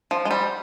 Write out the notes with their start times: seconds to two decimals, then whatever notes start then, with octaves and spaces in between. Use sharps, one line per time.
0.11 F3
0.25 G#3
0.31 G3